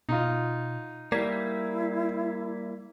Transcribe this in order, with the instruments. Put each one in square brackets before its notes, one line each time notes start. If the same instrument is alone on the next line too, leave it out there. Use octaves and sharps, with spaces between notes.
[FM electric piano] B2 [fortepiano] D#4 F4
[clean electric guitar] G3 A#3 [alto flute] E4 [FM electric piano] D5 G#6 B6